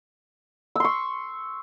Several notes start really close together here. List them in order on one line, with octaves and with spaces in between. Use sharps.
E6 C6 C#6